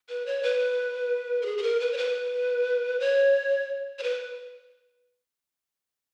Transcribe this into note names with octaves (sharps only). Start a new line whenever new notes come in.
B4
C#5
B4
A#4
G#4
G#4
A#4
B4
C#5
B4
C#5
C#5
B4